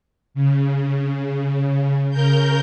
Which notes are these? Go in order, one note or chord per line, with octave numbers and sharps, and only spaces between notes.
C#3
C#3 A#4 G6